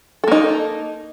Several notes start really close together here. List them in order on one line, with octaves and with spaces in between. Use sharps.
A4 A#3 D#4